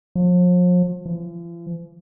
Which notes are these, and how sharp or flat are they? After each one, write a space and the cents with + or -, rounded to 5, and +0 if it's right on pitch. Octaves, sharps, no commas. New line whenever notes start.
F3 +40
F3 -45